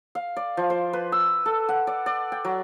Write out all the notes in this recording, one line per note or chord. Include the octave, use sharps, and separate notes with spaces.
F5
D5
F3
C5
B4
E6
A4
F#5
D5
D5
G5
F#3